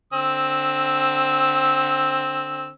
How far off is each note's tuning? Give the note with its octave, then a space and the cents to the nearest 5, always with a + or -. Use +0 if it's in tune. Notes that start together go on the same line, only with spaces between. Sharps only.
D3 +0 C4 +15 E6 -10